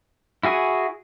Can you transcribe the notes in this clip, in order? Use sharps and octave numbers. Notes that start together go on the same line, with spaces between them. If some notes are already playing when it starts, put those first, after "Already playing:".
E4 F#4 G#4 G#5